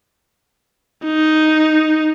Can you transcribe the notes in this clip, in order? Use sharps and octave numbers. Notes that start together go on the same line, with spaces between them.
D#4